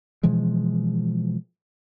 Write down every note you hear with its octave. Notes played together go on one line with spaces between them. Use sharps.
B2 E3 F3 G#3